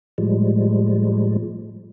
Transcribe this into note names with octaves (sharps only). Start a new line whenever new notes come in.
A2 F3 G3 G#3